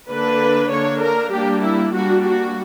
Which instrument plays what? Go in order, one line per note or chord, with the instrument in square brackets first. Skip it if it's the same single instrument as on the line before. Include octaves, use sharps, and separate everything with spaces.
[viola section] D3 A#3 D4 B4
D3 A#3 D4 C#5
A#4
G3 A#3 D4 G4
E4
G3 A#3 D4 F#4
F#4